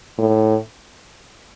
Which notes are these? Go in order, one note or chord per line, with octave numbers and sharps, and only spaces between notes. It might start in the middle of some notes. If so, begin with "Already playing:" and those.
A2